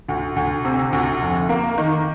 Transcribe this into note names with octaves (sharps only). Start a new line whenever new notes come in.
D2
D2
C3
D2
F1
A#3
D#3